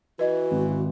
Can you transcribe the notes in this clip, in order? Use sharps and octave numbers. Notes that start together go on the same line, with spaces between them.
E3 F#4 B4 D#5
G#1